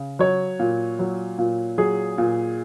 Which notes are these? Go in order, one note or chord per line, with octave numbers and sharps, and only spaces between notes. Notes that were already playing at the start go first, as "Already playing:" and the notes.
Already playing: C#3
F#3 C#5
A#2
F#3
A#2
F#3 G#4
A#2